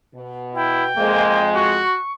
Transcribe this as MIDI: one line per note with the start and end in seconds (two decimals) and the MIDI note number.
0.15 0.91 47
0.55 0.84 64
0.55 1.50 79
0.97 1.80 41
0.97 1.80 56
0.97 1.38 58
1.55 1.97 66
1.55 2.13 85